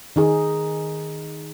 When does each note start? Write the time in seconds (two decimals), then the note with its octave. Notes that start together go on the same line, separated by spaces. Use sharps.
0.16 D#3 D#4 G#4